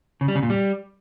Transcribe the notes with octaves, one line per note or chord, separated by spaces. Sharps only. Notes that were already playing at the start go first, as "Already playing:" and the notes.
C#3
G3
C#3
A#2
G3